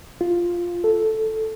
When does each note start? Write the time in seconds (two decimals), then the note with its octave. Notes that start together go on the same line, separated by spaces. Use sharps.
0.21 F4
0.84 A4